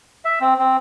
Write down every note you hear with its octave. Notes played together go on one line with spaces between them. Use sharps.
E5
C4
C4